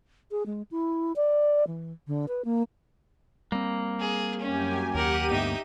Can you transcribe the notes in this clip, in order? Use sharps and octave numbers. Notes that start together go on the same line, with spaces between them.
G#4
G#3
E4
D5
E3
D3
B4
A#3
G3 A#3 C4
G#4
F#2 C#4 G4 G#5
D#2 G4 A#4 F#5 D#7
D2 G2 B3 D#4 E5